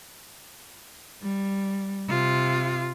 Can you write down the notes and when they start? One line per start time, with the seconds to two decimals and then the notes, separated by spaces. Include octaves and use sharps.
1.22 G3
2.09 C3 F4